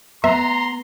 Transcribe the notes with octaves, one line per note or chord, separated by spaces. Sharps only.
B3 E5 A#5 C6